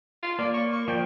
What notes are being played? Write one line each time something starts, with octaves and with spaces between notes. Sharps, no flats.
F4
A#3 D5
C#6
C#6
F3 D5 G5